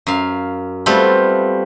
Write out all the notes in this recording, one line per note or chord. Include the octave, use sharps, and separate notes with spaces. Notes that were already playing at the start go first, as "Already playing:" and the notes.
F#2 F5
G3 A3 B3 C4 F4